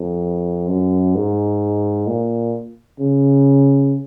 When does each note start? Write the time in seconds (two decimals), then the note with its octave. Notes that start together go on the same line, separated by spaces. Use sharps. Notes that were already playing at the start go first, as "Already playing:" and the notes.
Already playing: F2
0.68 F#2
1.15 G#2
2.07 A#2
3.00 C#3